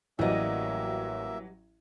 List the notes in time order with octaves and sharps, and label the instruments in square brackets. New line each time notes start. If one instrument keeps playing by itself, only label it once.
[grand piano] A1 [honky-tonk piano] E3 F#3 [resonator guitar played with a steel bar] G3 D#5 [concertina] A#3 E5